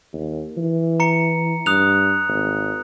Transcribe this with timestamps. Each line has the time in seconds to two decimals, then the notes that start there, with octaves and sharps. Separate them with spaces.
0.13 D#2
0.57 E3
1.00 A#5 C#7
1.66 G2 D#6 F#6 F7
2.28 G#1